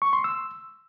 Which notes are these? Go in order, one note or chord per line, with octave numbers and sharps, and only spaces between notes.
C#6
C6
E6